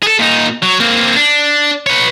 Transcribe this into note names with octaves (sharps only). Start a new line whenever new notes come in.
G#4 A4
A#2 D#4
F#3
A#3 C4
D4
B4 C#5